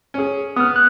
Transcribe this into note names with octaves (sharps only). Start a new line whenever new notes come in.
C#4 G#4
B3 D#6 F6
F#6